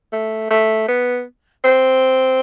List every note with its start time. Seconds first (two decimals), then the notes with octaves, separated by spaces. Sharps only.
0.12 A3
0.51 A3
0.88 B3
1.64 C4